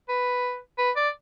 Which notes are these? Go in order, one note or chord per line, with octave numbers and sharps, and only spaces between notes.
B4
B4
D5